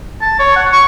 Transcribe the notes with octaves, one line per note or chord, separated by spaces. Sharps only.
A5
C#5
F#5
C#6